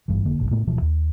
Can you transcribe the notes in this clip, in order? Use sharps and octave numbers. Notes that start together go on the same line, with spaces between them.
G#1 G2 E3
F1 D3 A#3
F#1 B1 A2
A2 A3 B3
D1 B2 E3 F3
D#2